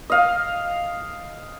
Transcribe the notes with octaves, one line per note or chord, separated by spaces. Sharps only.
D#5 F5